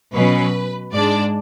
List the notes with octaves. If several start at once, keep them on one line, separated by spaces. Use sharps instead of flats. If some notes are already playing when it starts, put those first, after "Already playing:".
B2 F#3 C#4 B4
G#2 G#3 D4 D5